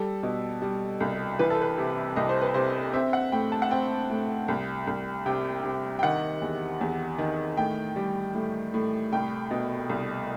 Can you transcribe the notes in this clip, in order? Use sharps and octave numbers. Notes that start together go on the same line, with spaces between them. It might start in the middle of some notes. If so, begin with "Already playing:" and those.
Already playing: G3 A4
B2
G3
C2
E3 B4
A4
B4
C3
C2 D#5
C5
B4
C3 C5
C4 E5
F#5
A2 G5
A5
F#5
C4 G5
A2
C2
C2
C3 G5
C3
G5
D#3 F#5
E2
E2
D#3
A2 G5
G3
A2
A2
C2 G5
B2
C2